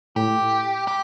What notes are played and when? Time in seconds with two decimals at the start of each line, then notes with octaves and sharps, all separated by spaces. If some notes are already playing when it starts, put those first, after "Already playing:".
0.16 A2 G4
0.88 G4